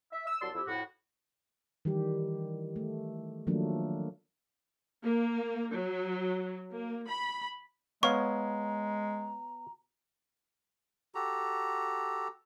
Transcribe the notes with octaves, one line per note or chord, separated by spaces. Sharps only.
E5
E6
C2 F#3 D5 A5 C6 E6
F2 F3 E4 G4 E6
F2 A2 F#4
D#3 E3 G3 G4
A3
D#3 F3 F#3 A3 A#3 D4
A#3
F#3
A#3
B5
G#3 B3 C#5 F5 A#5 C#6
F#4 G4 A4 A#5